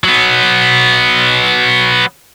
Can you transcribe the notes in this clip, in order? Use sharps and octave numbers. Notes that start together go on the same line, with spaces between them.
F#3 B3